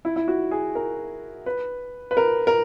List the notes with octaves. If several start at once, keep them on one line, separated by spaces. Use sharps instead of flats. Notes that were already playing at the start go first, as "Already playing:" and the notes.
E4
E4
F#4
G#4
A#4
B4
B4
A#4
A#4